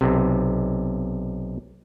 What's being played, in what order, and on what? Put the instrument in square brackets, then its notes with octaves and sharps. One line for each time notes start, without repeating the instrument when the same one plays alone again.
[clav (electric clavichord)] B1 C3